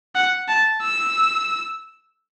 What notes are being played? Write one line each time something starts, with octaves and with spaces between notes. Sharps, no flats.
F#5
A5
E6